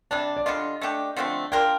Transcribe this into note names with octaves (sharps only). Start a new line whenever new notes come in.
C3 G3 D4 A5
D5
D3 G3 D4 F4 D#5
A3 D4 G4
D3 F3 A3 C4
A#3 D4 F4 A#4 G5